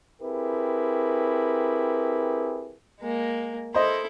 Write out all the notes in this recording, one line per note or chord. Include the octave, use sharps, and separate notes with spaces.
C4 E4 G4 G#4 A#4 B4
G#3 A#3
E4 A4 C5 D#5